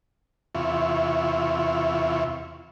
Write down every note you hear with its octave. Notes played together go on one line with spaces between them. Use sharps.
E2 C3 E4 F4 C#6